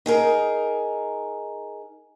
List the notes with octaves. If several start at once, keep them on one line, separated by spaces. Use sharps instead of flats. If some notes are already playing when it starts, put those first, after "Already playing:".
D#4 G#4 A#4